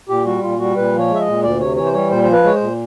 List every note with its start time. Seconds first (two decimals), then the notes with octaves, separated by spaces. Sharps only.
0.09 A#2 G4
0.25 G3 F#4
0.43 A#2 F4
0.59 G3 F#4
0.76 A#2 B4
0.93 F3
0.98 C#5
1.10 G#3 E5
1.20 D#5
1.26 A#2
1.43 D2 D5
1.60 C3 C#5
1.76 E3 C#5
1.85 C5
1.93 G3 C#5
2.10 A#2 C5
2.24 F3 C5
2.32 B4
2.44 G#3 C#5
2.55 C5
2.61 A#2